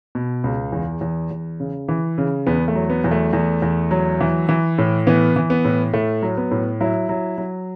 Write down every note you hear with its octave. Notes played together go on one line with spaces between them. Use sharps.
B2
C#2
E2
E2
E2
C#3
E3
C#3
E2 B3
A3
F#3
B3
E2
A3
E2
E2
F#3
E3
E3
A2
E3 B3
E3
B3
A2
A2 A3
F#3
B3
A2
F#3 E4
F#3
F#3